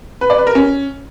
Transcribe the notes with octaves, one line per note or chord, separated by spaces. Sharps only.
B4
D5
B4
A#4
C#4